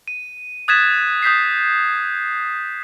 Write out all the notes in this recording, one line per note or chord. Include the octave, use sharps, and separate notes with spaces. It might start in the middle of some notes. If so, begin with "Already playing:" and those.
D#7
D#6 F#6 G#6 A6 B6 E7
D#6 G6 B6 C7